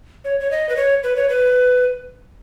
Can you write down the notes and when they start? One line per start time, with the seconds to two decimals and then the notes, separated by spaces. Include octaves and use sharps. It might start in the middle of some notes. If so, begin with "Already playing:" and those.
0.24 C#5
0.40 C#5
0.51 D#5
0.69 B4
0.76 C#5
1.03 B4
1.16 C#5
1.29 B4